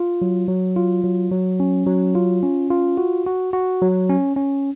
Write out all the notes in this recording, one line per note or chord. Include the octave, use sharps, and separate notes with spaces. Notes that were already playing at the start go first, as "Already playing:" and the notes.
Already playing: F4
F#3
F#3
F4
F#3
F#3
C#4
F#3
F4
C#4
F4
F#4
F#4
F#4
F#3
C#4
C#4